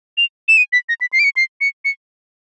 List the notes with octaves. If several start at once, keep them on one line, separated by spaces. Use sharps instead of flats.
F7
E7
D#7
B6
A#6
B6
C7
D7
C#7
C7
C#7
C#7